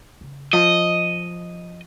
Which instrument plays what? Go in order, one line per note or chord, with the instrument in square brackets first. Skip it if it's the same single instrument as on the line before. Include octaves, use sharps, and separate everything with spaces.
[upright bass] C#3
[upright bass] F3 [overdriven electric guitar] D#5